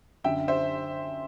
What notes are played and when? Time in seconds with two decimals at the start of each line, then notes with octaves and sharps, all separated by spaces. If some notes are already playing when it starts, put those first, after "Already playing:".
0.24 F#2 D3 E5 G5
0.48 C5 E5